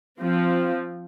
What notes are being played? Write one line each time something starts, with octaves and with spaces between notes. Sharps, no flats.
F3 C4